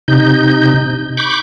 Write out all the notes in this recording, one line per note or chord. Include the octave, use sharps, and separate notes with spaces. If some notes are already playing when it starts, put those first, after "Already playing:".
C3 D#4 G6
B5 C#6 D6 G6